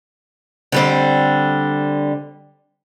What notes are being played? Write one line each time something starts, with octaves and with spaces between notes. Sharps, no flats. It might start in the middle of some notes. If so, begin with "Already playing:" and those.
D3 G3 C4